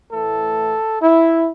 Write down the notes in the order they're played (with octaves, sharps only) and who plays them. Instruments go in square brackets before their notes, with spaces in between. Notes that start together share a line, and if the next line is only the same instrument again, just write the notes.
[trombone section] A2 E3 A3 A4
E4